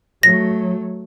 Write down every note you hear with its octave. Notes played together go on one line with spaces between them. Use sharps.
F#3 A3 A#6